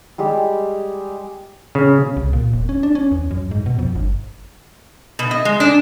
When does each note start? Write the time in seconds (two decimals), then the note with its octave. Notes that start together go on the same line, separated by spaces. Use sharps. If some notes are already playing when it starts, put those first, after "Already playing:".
0.18 G3 G#3 G4
1.75 C#3
2.17 C2
2.33 A#2
2.53 E1
2.69 C#4
2.83 D4
2.95 C#4
3.12 E2
3.31 F#2
3.51 G#2
3.66 B2
3.79 F2
3.95 G1
5.19 B2
5.31 D#5
5.45 G#3
5.60 D4